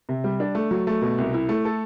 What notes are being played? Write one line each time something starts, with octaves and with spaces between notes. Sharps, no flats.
C3
G3
D4
A3
F#3
A3
B2
C2
E4
A3
A4